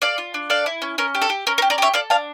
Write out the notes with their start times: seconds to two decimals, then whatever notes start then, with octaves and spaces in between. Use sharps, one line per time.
0.02 A4 D5 F5
0.18 F4
0.34 D4
0.50 A4 D5 F5
0.66 E4
0.82 C#4
0.98 C#4 A#4
1.15 G4
1.22 A4
1.30 G4
1.47 C#4 A#4
1.58 A#4
1.62 G4
1.70 A#4 D5
1.78 G4 C#5 E5
1.94 A4 D5 F5
2.10 D4 F5 A5